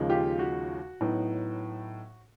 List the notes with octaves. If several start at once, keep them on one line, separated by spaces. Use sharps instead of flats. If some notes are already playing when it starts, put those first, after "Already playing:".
Already playing: D#2 C#3 F3 G#3
F4 G4
F#4
A2 F#3 B3 D#4